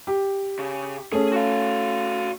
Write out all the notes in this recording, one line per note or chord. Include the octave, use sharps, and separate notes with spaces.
G4
C#3
A3 C#4 G#4
F#4 F5